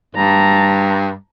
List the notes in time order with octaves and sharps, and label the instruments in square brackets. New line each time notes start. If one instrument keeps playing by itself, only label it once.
[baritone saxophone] G2 [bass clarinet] G3 [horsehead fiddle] A5 A#5